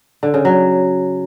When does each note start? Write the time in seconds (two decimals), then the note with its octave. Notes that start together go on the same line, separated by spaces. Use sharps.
0.23 D3
0.34 C#3
0.45 F#3